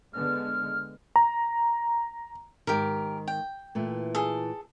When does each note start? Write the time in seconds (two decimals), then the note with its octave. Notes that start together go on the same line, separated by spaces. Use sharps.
0.13 D3 G#3 B3 F6
1.16 A#5
2.67 G#2 D#3 G4 A#4
3.28 G5
3.75 A#2 E3 A3
4.15 G#4 A4